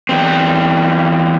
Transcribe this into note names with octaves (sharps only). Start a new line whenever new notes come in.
E2 C4